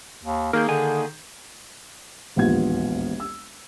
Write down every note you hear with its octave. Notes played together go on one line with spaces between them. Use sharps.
D#2
D#3 A#3 G#4 A#4 G6
D3 A#3 D#4 G#5
E1 A#1 D#2 B3 F4 G#6
E6